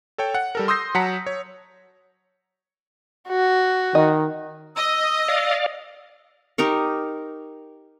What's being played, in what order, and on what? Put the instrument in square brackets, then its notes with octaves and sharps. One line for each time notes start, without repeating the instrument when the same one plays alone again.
[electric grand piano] A4 C#5 G5
F#5
G3 A4 A#4
C6 D#6 E6 G6 A#6 C7
F#3 F#5 A5 A#5 B6 C#7
C#5
[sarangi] F#4
[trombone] D#3 [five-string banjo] D#5
[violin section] D#5 [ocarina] E6
[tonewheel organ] D5 F5
[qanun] D#4 G4 A#4 C#6